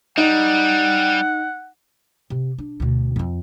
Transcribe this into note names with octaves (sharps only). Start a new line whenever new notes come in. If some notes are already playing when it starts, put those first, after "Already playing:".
G3 D#4 F#5
C3
D4
D2 B2
F2 F4